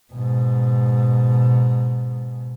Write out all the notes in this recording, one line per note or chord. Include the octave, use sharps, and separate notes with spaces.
G#2 B2